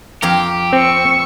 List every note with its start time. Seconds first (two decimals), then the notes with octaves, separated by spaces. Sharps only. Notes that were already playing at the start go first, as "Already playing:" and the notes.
0.22 F2 G4 F5 A#5
0.73 C4 C#6 E6